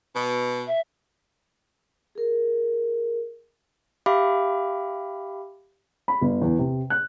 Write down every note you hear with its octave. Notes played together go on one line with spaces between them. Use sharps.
B2
E5
G#4 A#4
G4 E5 F5 G5 B5 D6
B5
G1
E2
C3
F#6